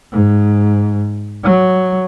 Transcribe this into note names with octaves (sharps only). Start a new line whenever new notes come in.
G#2
F#3